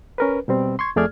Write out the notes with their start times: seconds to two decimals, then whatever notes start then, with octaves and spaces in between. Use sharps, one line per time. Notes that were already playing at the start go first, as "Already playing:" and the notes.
0.18 C#4 A#4 B4
0.48 B2 G3 C4
0.79 C6 C#6 G#6
0.96 F2 A3 G#4 D5 F6 G#6